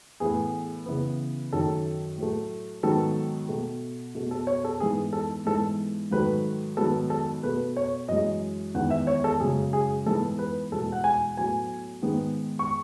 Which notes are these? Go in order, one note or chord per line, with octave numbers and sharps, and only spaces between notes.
A2 E3 B3 G#4
C#3 E3 B3
F#2 D#3 A3 A4
A2 F#3 A3
G#2 D#3 F#3 B3 A4
B2 A3
B2 A3
A4
C#5
A4
G#2 E3 B3 G#4
A4
G#2 E3 G#3 B3 A4
G#2 D#3 F#3 A3 B4
G#2 D#3 F#3 B3 A4
A4
B2 A3 B4
C#5
F#2 E3 G#3 D#5
E2 D#3 G#3 B3 F#5
E5
C#5
A4
F#2 C#3 G#3 G#4
G#4
G#2 E3 G#3 B3 A4
B4
E2 B2 G#3 A4
F#5
G#5
A2 F#3 B3 G#5
G#2 D#3 G#3 B3
C#6